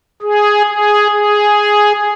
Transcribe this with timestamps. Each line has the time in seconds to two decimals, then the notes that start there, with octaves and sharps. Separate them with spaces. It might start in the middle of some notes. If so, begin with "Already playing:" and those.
0.22 G#4
0.67 G#4
1.12 G#4